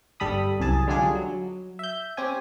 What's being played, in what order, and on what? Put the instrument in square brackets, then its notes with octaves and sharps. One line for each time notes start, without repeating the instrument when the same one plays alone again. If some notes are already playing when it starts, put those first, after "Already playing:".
[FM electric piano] G1 G2 G3 A4 B5 D#6
C2 F#2 G#4 A5
D3 G3 G#3 D4 F4 G#4
F#3
E5 G6
C4 C#4 G4 G#5